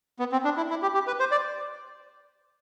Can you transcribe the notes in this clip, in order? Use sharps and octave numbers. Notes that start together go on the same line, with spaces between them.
B3
C4
D4
E4
E4
G4
G4
B4
C5
D5